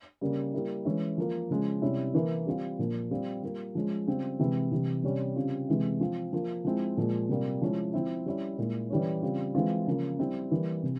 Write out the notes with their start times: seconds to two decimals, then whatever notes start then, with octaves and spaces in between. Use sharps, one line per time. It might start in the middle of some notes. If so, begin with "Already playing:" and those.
0.21 C#3 G3 A#3
0.54 G3 A#3 E4
0.85 E3 G#3 C#4 E4
1.18 F3 A#3 F4
1.50 C#3 F3 G#3 C#4
1.82 C3 G3 C#4 E4
2.15 E3 A#3 E4
2.47 G3 C4 F4
2.79 A#2 F3 A#3
3.11 G3 C4 F4
3.43 G3 A#3 F4
3.75 F3 G#3 C#4
4.07 C#3 G3 C4 F4
4.39 C3 E3 G#3 E4
4.72 C3 E3 G3
5.03 C3 G3 C#4
5.36 C#3 G3 C4 F4
5.69 C3 E3 G#3 E4
6.01 F3 C4 F4
6.33 F3 A#3 F4
6.65 F3 G#3 C4 E4
6.97 A#2 F3 G#3
7.29 C3 G3 A#3 F4
7.62 F3 G#3 C#4 E4
7.94 F3 C4 E4
8.26 G3 C#4 E4
8.58 A#2 G#3 E4
8.90 E3 G3 C#4
9.23 C#3 G3 C4 F4
9.55 E3 G#3 C4 F4
9.87 C#3 F3 A#3 F4
10.19 G3 C4 E4
10.52 E3 G3 A#3
10.83 C3